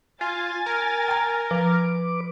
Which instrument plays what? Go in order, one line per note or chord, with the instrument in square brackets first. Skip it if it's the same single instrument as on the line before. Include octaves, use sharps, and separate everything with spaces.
[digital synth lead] F4 [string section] G#5 A6
[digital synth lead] A#4
[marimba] G5 A#5
[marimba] F3 [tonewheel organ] B4 D6